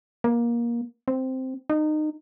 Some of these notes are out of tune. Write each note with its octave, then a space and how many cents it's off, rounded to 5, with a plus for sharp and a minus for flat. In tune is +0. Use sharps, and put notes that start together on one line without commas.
A#3 +20
C4 -5
D#4 -25